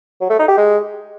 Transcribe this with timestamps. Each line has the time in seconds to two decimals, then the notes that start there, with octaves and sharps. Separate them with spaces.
0.21 F#3
0.30 A3
0.39 D#4
0.48 G4
0.57 G#3